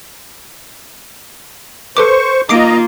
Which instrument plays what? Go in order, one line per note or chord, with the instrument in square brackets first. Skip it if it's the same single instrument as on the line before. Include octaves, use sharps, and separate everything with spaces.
[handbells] A4 B4 D6 [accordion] C5 C#6
[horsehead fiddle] A#3 F4 [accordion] D#5 A#5 [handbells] D6 C7 D7